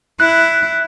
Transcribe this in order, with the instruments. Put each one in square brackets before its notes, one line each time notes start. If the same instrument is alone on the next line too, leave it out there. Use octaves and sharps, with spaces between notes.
[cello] E4 [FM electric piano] F#6